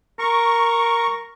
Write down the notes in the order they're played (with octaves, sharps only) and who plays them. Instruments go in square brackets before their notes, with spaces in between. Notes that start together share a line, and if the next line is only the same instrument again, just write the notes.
[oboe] A#4 [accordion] C#6